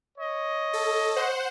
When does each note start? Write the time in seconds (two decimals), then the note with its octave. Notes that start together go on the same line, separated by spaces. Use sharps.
0.18 C#5 D#5
0.73 A4
1.16 C5 F#5